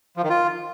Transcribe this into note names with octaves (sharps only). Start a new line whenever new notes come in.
F3
D#3
F4